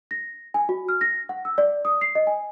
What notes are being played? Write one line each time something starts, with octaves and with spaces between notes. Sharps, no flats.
A#6
G#5
F#4
F6
A#6
F#5
E6
D5
D#6
C7
D#5
G#5